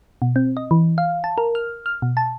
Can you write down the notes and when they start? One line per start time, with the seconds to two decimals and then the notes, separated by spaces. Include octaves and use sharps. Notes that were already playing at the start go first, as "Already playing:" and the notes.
0.22 B2
0.36 C4
0.57 D#5
0.71 E3
0.98 F5
1.24 A5
1.38 A#4
1.55 F6
1.86 F6
2.02 B2
2.17 A5